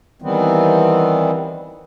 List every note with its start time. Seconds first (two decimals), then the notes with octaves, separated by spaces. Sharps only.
0.22 D#3 E3 G3 B3 C4